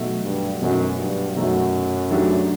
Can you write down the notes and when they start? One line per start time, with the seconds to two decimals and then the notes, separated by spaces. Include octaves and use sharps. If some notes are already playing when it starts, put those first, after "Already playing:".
Already playing: B2 F#3 A3
0.24 G2
0.62 F#2 B2 F#3 A3
0.99 G2
1.36 F#2 B2 F#3 A3
2.11 F#3 A3 D4 G4